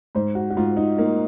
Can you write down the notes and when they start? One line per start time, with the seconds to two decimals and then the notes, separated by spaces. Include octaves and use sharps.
0.15 G#2 C5
0.35 F#4
0.50 F#4
0.57 G#2 F4
0.77 D#4
0.98 A#3 D#4